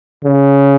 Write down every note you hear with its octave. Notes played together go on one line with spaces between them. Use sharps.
C#3